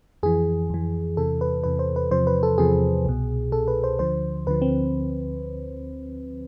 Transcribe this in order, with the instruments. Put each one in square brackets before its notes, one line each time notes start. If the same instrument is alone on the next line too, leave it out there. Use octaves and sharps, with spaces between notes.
[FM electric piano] F2 E3 G#4
F2 E3
E2 C3 E3 A4
B4
E2 C3 E3 B4
C5
B4
E2 C3 F3 C5
B4
A4
E2 C3 F3 G#4
C2 B2
C2 B2 A4
B4
C5
D2 D3 F3 C5
D2 D3 F3 B4
C4